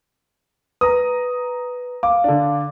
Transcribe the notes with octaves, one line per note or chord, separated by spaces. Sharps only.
B4 A#5 D#6
F5 D6
D3 D4